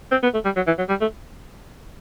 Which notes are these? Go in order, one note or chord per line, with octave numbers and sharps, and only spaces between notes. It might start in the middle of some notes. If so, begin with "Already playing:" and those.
C4
B3
A3
G3
F#3
E3
F#3
G3
A3